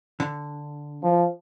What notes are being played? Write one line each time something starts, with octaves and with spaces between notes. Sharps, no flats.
D3
F3